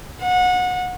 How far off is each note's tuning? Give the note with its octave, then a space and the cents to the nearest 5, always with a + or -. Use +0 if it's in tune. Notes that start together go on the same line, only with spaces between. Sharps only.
F#5 -25